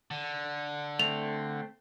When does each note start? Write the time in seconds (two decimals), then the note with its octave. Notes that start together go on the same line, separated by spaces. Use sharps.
0.11 D3
1.00 A3 C4 F7